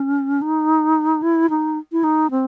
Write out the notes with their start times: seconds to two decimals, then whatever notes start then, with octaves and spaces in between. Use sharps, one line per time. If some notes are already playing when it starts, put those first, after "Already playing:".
Already playing: C#4
0.42 D#4
1.22 E4
1.50 D#4
1.92 E4
2.04 D#4
2.31 C4